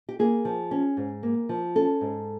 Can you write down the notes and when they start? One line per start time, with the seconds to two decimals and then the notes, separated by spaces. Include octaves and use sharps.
0.09 G4
0.19 A#3 G#4
0.45 F3
0.71 C#4
0.97 G#2
1.23 A#3
1.49 F3
1.75 C#4 A4
2.01 G#2